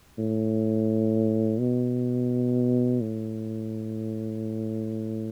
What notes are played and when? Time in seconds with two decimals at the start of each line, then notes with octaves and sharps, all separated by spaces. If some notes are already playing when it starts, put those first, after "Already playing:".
0.19 A2
1.60 B2
3.01 A2